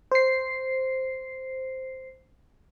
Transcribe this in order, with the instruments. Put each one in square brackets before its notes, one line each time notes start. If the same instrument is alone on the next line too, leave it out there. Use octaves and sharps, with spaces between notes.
[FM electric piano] C5 C7